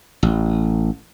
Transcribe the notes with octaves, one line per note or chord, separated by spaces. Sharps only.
A1